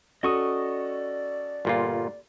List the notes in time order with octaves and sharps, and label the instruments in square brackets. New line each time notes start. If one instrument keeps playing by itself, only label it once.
[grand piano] C#4 F#4 A4 [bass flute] D5 [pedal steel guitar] D#5 C#6 D#6
[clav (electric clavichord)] G1 A#2 F4